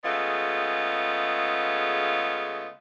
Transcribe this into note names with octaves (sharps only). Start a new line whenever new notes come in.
C#3 G#3 A3 B3 F4